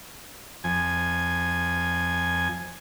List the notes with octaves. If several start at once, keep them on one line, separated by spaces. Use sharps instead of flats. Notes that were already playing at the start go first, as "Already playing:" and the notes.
F2 G#5